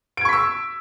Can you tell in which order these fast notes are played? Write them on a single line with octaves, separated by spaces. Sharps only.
D7 G#6 C#6 B6 E6